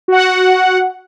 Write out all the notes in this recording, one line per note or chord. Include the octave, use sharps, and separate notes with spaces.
F#4 F#5